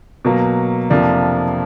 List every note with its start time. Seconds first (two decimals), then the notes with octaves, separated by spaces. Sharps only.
0.25 B2 F#3 A#3
0.90 F2 C3 F3 A#3 D4